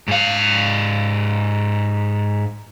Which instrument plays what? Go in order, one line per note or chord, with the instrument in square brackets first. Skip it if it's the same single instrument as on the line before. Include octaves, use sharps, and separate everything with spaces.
[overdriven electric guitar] G#2 F5